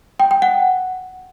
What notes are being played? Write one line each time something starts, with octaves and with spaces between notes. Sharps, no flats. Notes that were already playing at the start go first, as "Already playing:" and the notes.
G5
G5
F#5